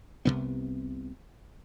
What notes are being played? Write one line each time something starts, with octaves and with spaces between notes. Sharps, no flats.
C2 F2 C3 B3